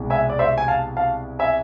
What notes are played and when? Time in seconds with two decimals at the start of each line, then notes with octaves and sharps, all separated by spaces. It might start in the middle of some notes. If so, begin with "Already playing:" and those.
Already playing: C2 B2 G#3
0.10 E5 G#5
0.29 D5
0.39 C5 E5
0.58 G#5
0.68 F5 A5
0.97 F5 A5
1.39 E5 G#5